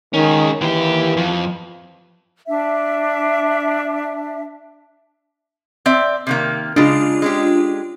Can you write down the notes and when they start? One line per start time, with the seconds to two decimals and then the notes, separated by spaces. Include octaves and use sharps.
0.14 D#3 G#3 C#4
0.61 D#2 E3 G4
1.17 F2
2.47 D4 E5
5.86 C4 D5 E5
6.27 C3 D#3 A#3
6.76 C#3 G#3 D4 F4
7.22 G#3 C#4 G4